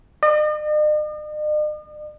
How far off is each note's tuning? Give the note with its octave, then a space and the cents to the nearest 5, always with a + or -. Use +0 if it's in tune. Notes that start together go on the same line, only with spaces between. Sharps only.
D#5 -45